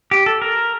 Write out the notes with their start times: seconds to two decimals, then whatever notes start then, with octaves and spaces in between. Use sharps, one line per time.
0.11 G4
0.26 A4
0.42 A#4